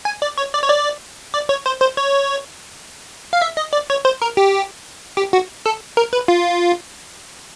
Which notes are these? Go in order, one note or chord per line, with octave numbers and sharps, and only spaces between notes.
G#5
D5
C#5
D5
C#5
D5
D5
C#5
C5
C5
C#5
F5
E5
D#5
D5
C#5
C5
A#4
G4
G4
F#4
A4
A#4
B4
F4